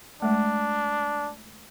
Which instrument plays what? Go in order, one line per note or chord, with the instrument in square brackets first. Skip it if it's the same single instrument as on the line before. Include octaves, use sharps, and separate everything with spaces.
[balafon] G#3 A3 [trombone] D4